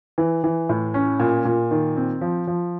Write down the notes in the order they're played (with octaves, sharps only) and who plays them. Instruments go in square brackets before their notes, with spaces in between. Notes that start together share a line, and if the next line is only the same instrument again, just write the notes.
[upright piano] E3
E3
A2
C#4
A#2
A#2
D#3
C4
F3
F3